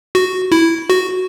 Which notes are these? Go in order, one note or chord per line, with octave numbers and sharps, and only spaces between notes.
F#4
E4
F#4